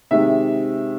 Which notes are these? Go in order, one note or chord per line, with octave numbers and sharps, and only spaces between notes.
C3 D#3 G#3 E5